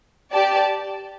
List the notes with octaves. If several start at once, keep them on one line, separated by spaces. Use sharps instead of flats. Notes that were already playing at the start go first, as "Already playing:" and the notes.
G4 D5 A5